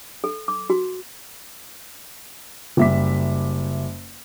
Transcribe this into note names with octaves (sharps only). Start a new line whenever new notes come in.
A4
D6
F#4
F#1 G3 E5 D6 B6